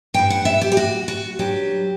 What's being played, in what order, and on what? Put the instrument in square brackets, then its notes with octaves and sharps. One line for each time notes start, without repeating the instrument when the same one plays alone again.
[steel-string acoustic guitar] G2 E3 G5
F#5
E5
G4
G4
F#4
F#4
G2 F#3 G4